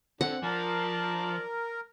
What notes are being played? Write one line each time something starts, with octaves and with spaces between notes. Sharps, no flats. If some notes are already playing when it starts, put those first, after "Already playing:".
D3 C4 F#5
F3 A#4 D5 A5